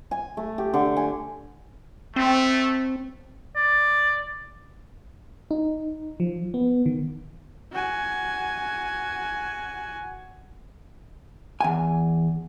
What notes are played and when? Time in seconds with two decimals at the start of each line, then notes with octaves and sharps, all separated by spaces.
0.11 G#5
0.37 A3
0.58 G4
0.74 D3
0.97 G#5
2.16 A3 C4
3.56 D5
5.51 D#4
6.20 F3
6.54 B3
6.86 D#3
7.73 F#4 G#5
11.61 E2 G#5